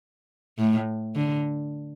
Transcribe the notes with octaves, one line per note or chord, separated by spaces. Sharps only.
A2
D3